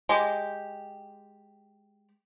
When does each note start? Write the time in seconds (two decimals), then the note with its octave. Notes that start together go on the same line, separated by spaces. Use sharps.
0.09 G#3 G4